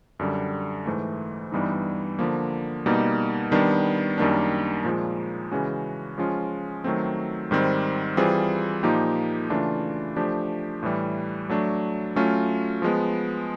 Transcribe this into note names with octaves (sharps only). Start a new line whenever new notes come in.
F#2 D3 G3
G#2 E3 A3
G2 E3 G3 B3 D#4
D3 F3 A#3
B2 G3 A#3 D#4
D#3 G3 B3 D4
F#2 D#3 G3 A#3 D4
A#2 F3 G#3
C#3 E3 G#3 C#4 F#4
F3 G#3 C#4 F4
D#3 F#3 A3 C4
G#2 D#3 G3 C4
E3 G3 C4 F4 G#4
A#2 F3 A#3 D#4 G4
C#3 E3 A3 D4 F4
F3 A3 D4 G4
A2 E3 G3
F#3 A3 D4
F#3 A3 C#4 F4
F3 G#3 B3